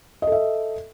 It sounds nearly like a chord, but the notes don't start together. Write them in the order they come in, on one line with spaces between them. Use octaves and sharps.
D#5 A4 E5